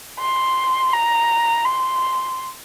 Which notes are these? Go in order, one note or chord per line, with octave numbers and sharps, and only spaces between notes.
C6
A#5
C6